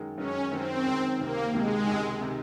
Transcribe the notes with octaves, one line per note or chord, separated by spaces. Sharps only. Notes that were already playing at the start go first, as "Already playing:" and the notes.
Already playing: F#2 D#3 G#3
F#2 D#3 G#3 C#4
F#2 D#3 G#3 C4
F#2 D#3 G#3
C#2 C3 D#3 A#3
C#2 C3 D#3 G#3
C#2 C3 D#3
C3 D#3